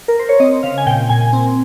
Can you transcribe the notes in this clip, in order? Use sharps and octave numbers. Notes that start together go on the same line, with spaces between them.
A#4
C5
C#5
C4 D#5
C#3 F5
G#5
A#2 G5
A#2 G#5
C4